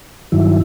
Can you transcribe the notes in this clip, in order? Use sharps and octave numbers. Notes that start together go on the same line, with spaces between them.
G2 D#3 F#3 E4